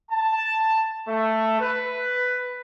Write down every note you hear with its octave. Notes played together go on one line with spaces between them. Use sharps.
A5
A3
B4